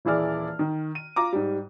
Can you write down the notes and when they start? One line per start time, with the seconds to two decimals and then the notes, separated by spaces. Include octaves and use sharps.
0.05 D#1 E3 E4 G#4 D5 F6
0.59 D#3
0.95 D#7
1.16 F4 A#5 D6
1.33 G#2 G3